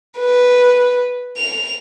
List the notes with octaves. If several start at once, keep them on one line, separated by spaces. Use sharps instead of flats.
B4
F7